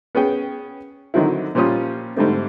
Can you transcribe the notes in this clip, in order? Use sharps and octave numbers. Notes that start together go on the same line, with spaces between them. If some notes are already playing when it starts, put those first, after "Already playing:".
B3 C#4 G#4 G5
D3 D#3 F#3 C4 E4
A#2 F3 G3 C#4 F4 D#6
G#2 D3 G3 A3 C4